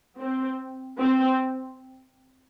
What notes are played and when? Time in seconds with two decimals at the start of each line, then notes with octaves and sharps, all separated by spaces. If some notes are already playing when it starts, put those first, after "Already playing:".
0.19 C4
0.99 C4